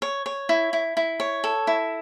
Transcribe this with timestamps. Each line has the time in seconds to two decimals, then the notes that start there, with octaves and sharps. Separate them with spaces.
0.02 C#5
0.26 C#5
0.49 E4
0.73 E4
0.97 E4
1.20 C#5
1.44 A4
1.67 E4